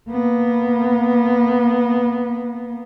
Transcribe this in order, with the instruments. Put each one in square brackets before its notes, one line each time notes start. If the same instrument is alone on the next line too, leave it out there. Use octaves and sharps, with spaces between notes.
[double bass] A#3 B3